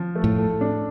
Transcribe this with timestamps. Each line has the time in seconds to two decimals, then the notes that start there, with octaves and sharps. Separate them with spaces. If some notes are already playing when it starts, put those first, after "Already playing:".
Already playing: F3
0.15 A3
0.24 A2
0.38 A4
0.61 D4